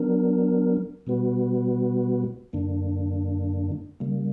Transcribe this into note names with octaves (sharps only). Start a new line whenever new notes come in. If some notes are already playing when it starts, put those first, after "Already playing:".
Already playing: F#3 B3 D4 A#4
B2 G3 B3 F#4 B4
F#2 D3 A#3 D4
C#3 G3 A#3